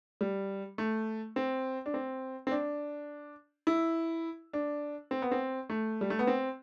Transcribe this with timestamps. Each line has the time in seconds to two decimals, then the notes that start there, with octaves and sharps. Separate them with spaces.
0.21 G3
0.78 A3
1.36 C4
1.86 D4
1.94 C4
2.47 C4
2.51 D4
3.67 E4
4.53 D4
5.11 C4
5.22 B3
5.31 C4
5.70 A3
6.01 G3
6.10 A3
6.19 B3
6.27 C4